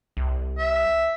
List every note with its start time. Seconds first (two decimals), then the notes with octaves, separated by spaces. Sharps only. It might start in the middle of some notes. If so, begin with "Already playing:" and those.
0.17 C2
0.58 E5